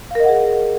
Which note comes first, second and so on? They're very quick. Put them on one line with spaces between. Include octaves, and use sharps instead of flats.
F5 A#4 D#5 F#5 G#4